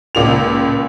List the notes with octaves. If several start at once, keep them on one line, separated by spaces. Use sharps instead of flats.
C#2 A#2 F7